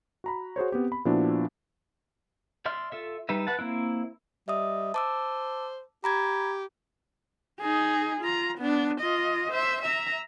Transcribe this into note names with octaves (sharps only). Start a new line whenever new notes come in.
F#4 A#5 B5
F#4 G#4 C5 C#5
B3 C4 G4
B5
A#2 F3 B3 D4 E4 F#4
D5 E5 C6 F6
F4 A4 E5
G3 D#4 B4 E5
B4 F#5 A5
A#3 C4 E4
G3 D#5 E5 D#6
C5 A5 D6 E6
G4 A#5 B5 G#6
D#4 G#4
F4 A#5
B3 D4
F4 D#5
C5 E5
E5 A#5